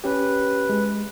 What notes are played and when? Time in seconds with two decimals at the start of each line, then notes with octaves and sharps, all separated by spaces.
0.04 C#4 G4 B4
0.69 G#3